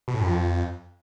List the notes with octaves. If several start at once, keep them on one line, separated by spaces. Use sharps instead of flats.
B2
A2
F#2
F2